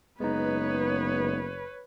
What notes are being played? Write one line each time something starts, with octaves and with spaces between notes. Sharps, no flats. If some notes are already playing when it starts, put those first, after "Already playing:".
F#1 G#3 B3 D#4 B4 C#5